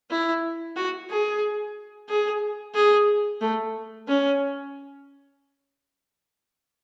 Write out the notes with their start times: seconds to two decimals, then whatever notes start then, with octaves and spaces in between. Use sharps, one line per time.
0.10 E4
0.76 F#4
1.10 G#4
2.09 G#4
2.75 G#4
3.41 A3
4.08 C#4